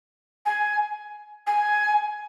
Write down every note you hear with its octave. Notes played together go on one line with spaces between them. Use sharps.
G#5
G#5